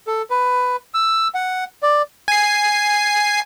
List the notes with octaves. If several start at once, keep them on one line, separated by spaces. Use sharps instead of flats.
A4
B4
E6
F#5
D5
G#5 C7